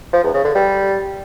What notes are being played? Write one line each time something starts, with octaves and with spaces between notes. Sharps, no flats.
F3
E2
C#3
D3
G3